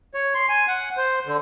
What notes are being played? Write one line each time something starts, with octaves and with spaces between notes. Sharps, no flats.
C#5
C6
G#5
F#5
C5
D3